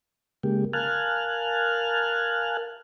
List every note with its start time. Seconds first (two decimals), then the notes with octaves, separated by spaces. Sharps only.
0.43 C#3 G#3 A#3 G4
0.73 A#4 F5 G#5 A5 F6 F#6